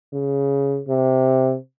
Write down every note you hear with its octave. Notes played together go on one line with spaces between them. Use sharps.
C#3
C3